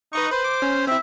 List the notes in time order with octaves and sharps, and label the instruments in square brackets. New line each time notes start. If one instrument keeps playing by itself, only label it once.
[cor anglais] D#4 [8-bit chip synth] B4 D#5 C#6
[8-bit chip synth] B4 [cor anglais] C5
[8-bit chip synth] D6
C#4
[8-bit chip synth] C4 E4 [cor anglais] E5